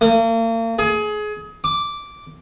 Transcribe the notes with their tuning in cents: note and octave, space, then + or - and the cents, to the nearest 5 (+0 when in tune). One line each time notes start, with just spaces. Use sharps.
A#3 -40
G#4 +25
D6 -5